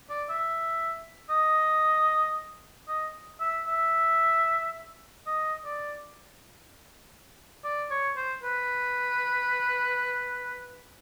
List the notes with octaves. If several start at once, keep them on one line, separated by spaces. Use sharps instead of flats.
D5
E5
D#5
D#5
E5
E5
D#5
D5
D5
C#5
C5
B4